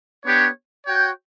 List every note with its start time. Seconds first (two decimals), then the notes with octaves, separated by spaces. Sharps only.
0.25 B3 D4 G4 C#5
0.87 F#4 C#5 G5